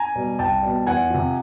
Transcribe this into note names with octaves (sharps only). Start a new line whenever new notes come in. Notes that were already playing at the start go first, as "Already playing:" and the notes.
Already playing: G#5 A#5
B2 G3
C2 G5 A5
B2 G3
E2 F#5 G#5
C3 F3